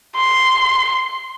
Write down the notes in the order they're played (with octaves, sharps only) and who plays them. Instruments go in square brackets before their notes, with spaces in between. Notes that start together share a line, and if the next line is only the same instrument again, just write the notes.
[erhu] C6